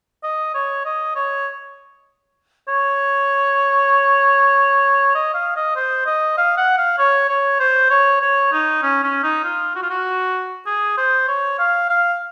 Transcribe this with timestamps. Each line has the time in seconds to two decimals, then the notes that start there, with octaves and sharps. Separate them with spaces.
0.24 D#5
0.55 C#5
0.85 D#5
1.16 C#5
2.68 C#5
5.15 D#5
5.34 F5
5.56 D#5
5.76 C5
6.06 D#5
6.38 F5
6.58 F#5
6.78 F5
6.99 C#5
7.29 C#5
7.60 C5
7.91 C#5
8.21 C#5
8.52 D#4
8.83 C#4
9.04 C#4
9.23 D#4
9.44 F4
9.75 F#4
9.83 F4
9.91 F#4
10.66 G#4
10.98 C5
11.28 C#5
11.59 F5
11.90 F5